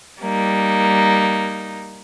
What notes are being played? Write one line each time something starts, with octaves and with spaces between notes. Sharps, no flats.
G3 A#3 D#4